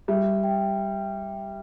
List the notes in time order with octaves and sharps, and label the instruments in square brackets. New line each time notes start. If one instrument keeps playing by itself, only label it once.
[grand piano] G3 [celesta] E5
[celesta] G5